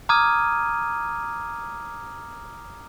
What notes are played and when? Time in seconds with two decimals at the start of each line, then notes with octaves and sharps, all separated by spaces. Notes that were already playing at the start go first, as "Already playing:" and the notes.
0.09 A#5 D6 D#6 F6 G#6 D#7